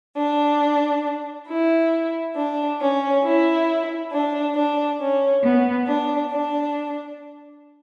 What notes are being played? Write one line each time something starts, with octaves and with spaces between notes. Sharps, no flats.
D4
E4
D4
C#4
E4
D4
D4
C#4
B3
D4
D4